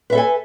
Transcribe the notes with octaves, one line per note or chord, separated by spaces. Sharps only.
A4 B4 E5 G#5